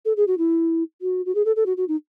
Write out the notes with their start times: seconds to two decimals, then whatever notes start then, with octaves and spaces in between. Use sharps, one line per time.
0.05 A4
0.17 G#4
0.27 F#4
0.38 E4
1.02 F#4
1.26 F#4
1.35 G#4
1.45 A4
1.56 A4
1.66 F#4
1.77 F#4
1.88 D#4